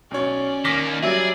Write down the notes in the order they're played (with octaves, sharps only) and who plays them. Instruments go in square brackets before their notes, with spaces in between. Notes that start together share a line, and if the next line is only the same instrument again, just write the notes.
[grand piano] B1 C#5 [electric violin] C#4 D5
[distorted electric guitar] D#3 A#3 [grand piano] D6 A#6 B6
[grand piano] F#3 G3 [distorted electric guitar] G#4 [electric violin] D5 [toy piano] E5 E6